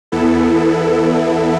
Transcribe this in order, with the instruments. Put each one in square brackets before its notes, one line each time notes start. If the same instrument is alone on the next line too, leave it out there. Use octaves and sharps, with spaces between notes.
[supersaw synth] E2 E3 B3 E4 A4